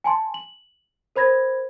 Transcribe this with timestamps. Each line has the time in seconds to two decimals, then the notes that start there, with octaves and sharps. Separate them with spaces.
0.04 G#5 A5 C6
0.34 F#7
1.16 A#4 C5 B5 G#6 A#6